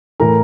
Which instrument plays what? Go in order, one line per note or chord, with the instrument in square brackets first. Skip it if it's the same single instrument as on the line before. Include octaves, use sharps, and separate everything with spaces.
[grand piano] A2 E3 A#4 A#5